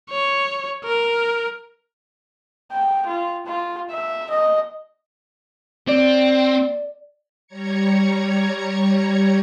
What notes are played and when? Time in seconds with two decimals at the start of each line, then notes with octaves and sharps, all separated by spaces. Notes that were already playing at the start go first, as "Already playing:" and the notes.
0.10 C#5
0.84 A#4
2.72 G5
3.07 F4
3.47 F4
3.90 E5
4.31 D#5
5.88 C4 D5
7.47 G3 C#5 A#5 G#6 C#7